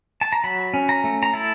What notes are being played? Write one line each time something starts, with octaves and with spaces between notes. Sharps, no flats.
A5
A#5
F#3 B5
C#4
A#5
A3
A#5
E4 A5